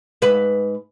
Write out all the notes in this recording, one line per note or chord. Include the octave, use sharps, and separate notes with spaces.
G#2 B4